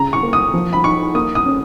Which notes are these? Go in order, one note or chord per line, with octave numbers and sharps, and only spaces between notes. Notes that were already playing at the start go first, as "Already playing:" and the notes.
Already playing: C#3 A#5
C#6
A#3
D#6
F3
B5
D#4 C#6
A#3 D#6
D#6
C#4